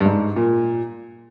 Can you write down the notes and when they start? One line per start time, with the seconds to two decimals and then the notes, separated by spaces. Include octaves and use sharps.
0.01 G2
0.06 G#2
0.36 A#2